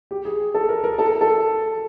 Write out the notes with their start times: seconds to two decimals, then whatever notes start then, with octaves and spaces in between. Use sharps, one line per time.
0.11 G4
0.25 G#4
0.54 A4
0.69 A#4
0.84 A#4
0.98 A4
1.21 A4